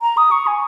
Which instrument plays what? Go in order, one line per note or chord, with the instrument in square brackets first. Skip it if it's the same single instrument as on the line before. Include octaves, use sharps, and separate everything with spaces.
[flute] A#5
D#6
C#6
G#5